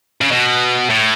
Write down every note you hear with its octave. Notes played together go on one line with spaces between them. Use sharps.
C#3
B2
A2